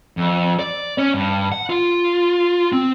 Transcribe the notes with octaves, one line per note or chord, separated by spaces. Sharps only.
F2
D5
C#4
G2
F#5
F4
C4